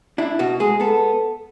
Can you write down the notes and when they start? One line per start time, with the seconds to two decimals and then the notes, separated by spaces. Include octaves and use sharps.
0.18 D4 E4
0.39 B2 F#4
0.60 G#3 G#4
0.80 B3 A4